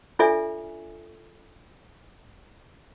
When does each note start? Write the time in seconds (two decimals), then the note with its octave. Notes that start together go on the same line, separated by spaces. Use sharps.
0.19 D4 F4 A4 D5 E5 G#5